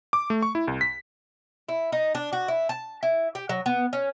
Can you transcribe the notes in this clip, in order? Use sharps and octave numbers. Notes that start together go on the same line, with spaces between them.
D6
A3
C#6
E4
C2
B6
E4
D#4
D4
F#4
E4
A5
E4
G4
F#3
B3
C#4